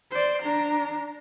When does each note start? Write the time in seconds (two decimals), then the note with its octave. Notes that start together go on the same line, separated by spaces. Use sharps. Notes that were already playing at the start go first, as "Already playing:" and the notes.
0.11 C5 D5
0.42 D4 A#5